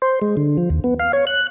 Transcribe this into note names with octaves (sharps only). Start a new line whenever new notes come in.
C5
G#3
D3
F3
D#2
B3
F5
C#5
F#6